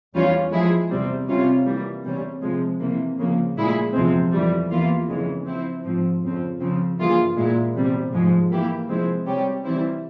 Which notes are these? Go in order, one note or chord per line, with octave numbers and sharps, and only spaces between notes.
E2 E3 G3 C#4 F4
F3 G#3 E4 G#4
E2 C3 G3 C4
C3 G3 C#4 F4
E3 G3 A#3
E2 C3 G3 C#4
C3 F3 G#3
C3 E3 A#3
C#3 F3 A#3
A#2 G#3 E4 G#4
E2 C3 F3 G#3 C4
F2 E3 G3
E2 E3 A#3 F4
F2 C#3 E3 G#3
F3 C4 E4
G#2 F3 C4
F2 C#3 F3 C4
C#3 F3 C4
G2 E3 A#3 F4 G#4
A#2 G#3 E4
E2 C3 G3
G#2 F3 G#3
E3 A#3 E4 G4
C3 F3 G#3 C4 E4
C3 G3 C#4 G4
C3 E3 G3 C4 E4